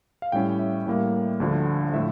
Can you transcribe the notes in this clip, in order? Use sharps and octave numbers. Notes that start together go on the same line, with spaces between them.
F5
A2 G3 C#4 E4 G5
E5
A2 G3 A#3
D2 D3 F3
A2 F3 A3 E5